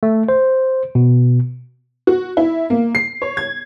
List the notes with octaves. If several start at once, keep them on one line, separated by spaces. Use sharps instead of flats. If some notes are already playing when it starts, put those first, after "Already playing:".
A3
C5
B2
F#4
E4
A#3
C7
C#5
G#6